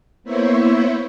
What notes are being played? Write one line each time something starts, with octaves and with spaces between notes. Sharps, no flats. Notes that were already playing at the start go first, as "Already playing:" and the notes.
A#3 B3 E4 C5 C#5 E5